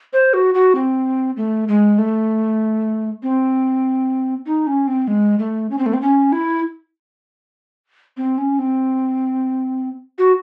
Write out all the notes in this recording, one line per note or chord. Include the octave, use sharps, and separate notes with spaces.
C5
F#4
F#4
C4
A3
G#3
A3
C4
D#4
C#4
C4
G#3
A3
C#4
C4
A3
C4
C#4
E4
C4
C#4
C4
F#4